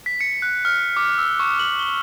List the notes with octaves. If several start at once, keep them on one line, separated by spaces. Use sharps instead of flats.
B6
C#7
F#6
F6
D6
E6
C#6
F#7
G7